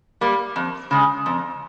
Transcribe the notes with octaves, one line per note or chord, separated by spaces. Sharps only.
G3 A#3
F2
C#3 G#3
F2